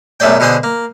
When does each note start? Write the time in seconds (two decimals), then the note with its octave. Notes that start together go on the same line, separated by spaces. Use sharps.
0.20 B1 F#2 A3 G#4 D5 G5
0.40 B2 D3 G#4 C5 G#5 D#6
0.63 A#3